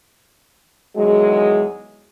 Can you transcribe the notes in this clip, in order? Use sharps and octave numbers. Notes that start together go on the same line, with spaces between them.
E2 D#3 F#3 G#3